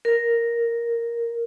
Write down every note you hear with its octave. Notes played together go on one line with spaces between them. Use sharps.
A#4